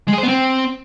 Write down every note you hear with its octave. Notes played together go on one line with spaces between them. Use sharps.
G#3
G#4
C5
B3
C4